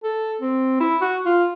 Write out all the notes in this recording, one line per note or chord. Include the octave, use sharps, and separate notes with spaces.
A4
C4
E4
F#4
F4